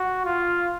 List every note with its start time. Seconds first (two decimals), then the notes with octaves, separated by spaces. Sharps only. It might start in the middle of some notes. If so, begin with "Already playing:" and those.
Already playing: F#4
0.25 F4